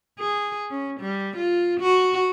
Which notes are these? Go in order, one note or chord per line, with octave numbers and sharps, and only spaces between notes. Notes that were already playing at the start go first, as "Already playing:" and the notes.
G#4
C#4
G3
F4
F#4